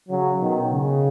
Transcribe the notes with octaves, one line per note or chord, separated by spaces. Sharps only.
C#3 F#3
B2 D#3
C#3